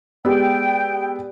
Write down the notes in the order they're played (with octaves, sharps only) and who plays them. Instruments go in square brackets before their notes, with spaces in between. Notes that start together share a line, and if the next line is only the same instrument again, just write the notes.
[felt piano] G#3 B3 [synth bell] G4 D5 E6 [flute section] G5